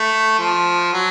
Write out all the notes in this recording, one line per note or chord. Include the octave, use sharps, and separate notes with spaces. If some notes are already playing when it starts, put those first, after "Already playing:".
Already playing: A3
F3
F#3